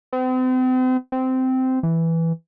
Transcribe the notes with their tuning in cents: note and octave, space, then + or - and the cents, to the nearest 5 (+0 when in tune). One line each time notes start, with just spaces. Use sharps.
C4 -40
C4 -15
E3 +0